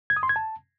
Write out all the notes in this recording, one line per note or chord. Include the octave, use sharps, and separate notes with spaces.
G#6
D#6
C6
G#6
A5